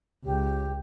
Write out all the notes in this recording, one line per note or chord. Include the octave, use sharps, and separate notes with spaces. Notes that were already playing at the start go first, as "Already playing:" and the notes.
C#2 G4